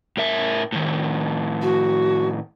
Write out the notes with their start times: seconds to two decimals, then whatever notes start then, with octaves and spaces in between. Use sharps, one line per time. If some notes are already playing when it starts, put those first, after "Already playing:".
0.17 A2 A#4 E5
0.72 A2 D#3
1.62 F#4